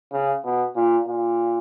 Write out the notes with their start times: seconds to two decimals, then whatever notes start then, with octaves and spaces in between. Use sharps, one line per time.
0.12 C#3
0.44 B2
0.75 A#2
1.07 A#2